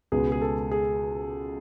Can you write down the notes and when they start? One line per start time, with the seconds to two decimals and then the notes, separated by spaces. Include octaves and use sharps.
0.12 C#2 B2 G#3 B3 G#4
0.32 G#4
0.41 A4
0.71 G#4